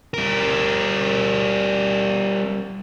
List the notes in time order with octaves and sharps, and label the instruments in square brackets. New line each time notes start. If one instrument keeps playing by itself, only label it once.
[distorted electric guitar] G3 A#4